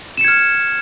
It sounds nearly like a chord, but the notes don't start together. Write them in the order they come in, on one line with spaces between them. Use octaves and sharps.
E7 C#7 G#6 F6